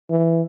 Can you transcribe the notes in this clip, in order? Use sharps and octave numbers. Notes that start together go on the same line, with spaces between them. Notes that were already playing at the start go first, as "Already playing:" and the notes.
E3